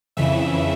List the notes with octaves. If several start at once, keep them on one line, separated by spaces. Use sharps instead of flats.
F2 C#3 E3 E5